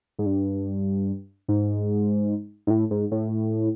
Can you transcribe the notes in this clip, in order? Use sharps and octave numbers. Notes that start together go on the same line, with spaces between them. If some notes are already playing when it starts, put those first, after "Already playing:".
G#2
G2
G#2
G#2
A2
G#2
A2